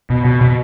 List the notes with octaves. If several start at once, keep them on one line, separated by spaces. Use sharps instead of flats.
B2
B2
B2